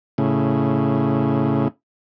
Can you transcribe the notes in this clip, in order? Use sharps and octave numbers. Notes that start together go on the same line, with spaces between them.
A2 C#3